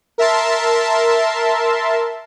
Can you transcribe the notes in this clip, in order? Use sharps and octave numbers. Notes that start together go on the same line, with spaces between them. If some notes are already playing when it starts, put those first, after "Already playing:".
A#4 E5 A5 C6